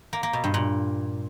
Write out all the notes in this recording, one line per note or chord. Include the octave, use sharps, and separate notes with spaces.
A#3
A#3
B2
G2
A#2